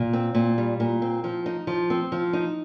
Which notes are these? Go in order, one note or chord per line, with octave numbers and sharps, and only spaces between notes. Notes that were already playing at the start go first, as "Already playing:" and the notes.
Already playing: A#2
C4
A#2
G3
A#2
C4
F3
D#4
F3
C4
F3
D#4